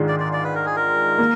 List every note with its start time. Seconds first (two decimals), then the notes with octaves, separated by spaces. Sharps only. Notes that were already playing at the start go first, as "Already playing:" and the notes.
Already playing: G#2 D#3 G#3 D4 F4
0.08 D5
0.20 D5
0.33 D5
0.44 B4
0.55 A#4
0.66 G#4
0.76 A#4
1.18 A#3